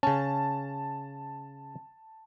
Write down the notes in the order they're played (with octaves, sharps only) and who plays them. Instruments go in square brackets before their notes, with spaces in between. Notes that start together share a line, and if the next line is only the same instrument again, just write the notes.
[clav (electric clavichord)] C#3 C#4 [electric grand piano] A5